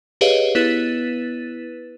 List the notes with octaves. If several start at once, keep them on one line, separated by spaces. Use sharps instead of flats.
G4 G#4 B4 C#5 D#5 F5
B3 E4 B4 A6 D#7